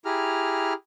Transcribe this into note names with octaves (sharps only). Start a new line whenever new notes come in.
E4 G4 G#4 A#5 F6